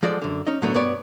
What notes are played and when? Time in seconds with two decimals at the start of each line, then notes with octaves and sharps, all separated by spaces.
0.03 F3 G#3 F#4 A4 D5
0.22 F#2 D3
0.47 C#4 D#4 D#5
0.62 A2 D3 F#3 A3 B3
0.74 B1 G2 B3 B4 C#5 D5